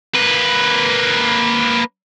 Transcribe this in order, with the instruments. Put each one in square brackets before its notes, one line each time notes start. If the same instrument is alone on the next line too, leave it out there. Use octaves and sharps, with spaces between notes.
[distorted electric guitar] A#3 B4